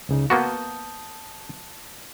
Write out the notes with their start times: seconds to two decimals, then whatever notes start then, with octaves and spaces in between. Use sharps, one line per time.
0.09 C#2 C#3 D#4
0.30 A#3 B3 F#4 A5 D#6 G6